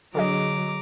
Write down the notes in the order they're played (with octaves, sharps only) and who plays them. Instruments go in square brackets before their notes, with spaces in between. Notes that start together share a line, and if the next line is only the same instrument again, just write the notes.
[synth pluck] D3 G#4 D#5 [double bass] F#3 [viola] A#5 D6